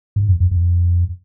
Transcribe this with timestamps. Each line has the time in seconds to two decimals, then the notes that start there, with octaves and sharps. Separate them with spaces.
0.16 G#2
0.28 F2
0.40 F2
0.51 F2